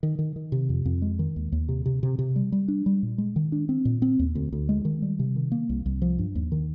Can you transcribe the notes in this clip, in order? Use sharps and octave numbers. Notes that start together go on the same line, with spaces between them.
D#3
D#3
D#3
C3
F2
F2
G#3
D#3
D#2
D#2
C3
C3
C3
C3
G3
G3
D4
G3
A#2
G#3
D#3
D4
C4
A#2
C4
D#2
D2
D2
G#3
D#3
G3
C3
D#3
A#3
C2
C2
F3
G2
D#2
D#3